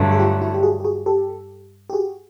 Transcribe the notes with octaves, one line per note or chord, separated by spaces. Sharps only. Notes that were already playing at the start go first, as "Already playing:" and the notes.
Already playing: G2 D3 F#3 A3
G#4
F4 G4
E4 F#4
G4
F#4 G#4
G4
F#4 G#4
G4 A4
G4
F#4 G#4